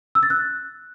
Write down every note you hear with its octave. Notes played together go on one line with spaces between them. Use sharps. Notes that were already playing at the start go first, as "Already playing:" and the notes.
E6
A6
F#6